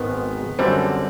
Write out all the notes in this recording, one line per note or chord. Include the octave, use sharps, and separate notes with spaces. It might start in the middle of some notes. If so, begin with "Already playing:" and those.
Already playing: G#1 G#2 D#3 G#3 B3
F#2 D3 G3 C4